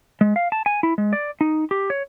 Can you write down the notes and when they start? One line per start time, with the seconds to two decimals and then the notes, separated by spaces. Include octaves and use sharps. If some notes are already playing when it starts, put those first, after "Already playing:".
0.21 G#3
0.36 F5
0.52 A5
0.66 G#5
0.83 E4
0.98 G#3
1.13 D5
1.41 D#4
1.71 G4
1.90 C#5